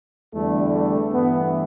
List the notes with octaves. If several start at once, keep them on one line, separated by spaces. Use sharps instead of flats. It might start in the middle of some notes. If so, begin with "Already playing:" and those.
E2 D3 G3 A3
A3
G2 E3 A3 B3